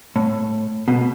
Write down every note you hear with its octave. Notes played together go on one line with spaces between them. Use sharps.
A2
B2